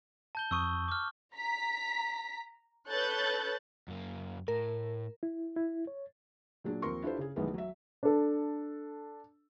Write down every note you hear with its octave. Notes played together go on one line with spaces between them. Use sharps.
A5 G6 G7
F2 C#6 D#6 E6
D6 F6
A#5 B6
A4 B4 C#5 F#6 G6 A6
F#2 A#3
A2 A#4
E4
E4
C#5
A#2 F#3 D4 G#4
D#2 F3 C4 A#4 C6 C#6
D4 E4 F4 G4 A4 C5
C#3 G#4
B1 D#3 E3 G#3 A3 B3
F#3 E5
D4 A4